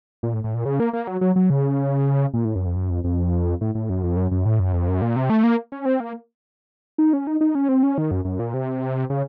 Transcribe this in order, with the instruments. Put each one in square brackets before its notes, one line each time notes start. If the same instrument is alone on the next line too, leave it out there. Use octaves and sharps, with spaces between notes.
[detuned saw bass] A#2
A2
A2
A#2
C#3
A#3
A#3
F#3
F#3
F#3
C#3
A#2
A2
F#2
F2
F#2
F2
F2
A2
A2
F#2
F2
F#2
F#2
A2
F#2
F2
F#2
A#2
C3
A3
A#3
C#4
C4
A#3
D#4
C#4
D#4
D#4
C#4
C4
C#4
D#3
F#2
F#2
A#2
C3
C#3